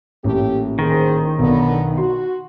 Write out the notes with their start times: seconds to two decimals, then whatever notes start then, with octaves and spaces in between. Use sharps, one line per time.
0.24 A1 A#2 A3 G4
0.79 D#3 G#4 C5
1.39 B1 D3 B3
1.98 F#4 C6